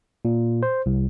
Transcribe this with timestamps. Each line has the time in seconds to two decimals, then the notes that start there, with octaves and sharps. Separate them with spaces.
0.25 A#2
0.63 C5
0.86 C2